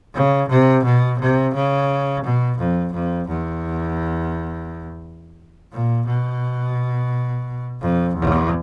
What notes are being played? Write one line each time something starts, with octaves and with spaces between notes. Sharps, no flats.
C#3
C3
B2
C3
C#3
B2
F2
F2
E2
A#2
B2
F2
E2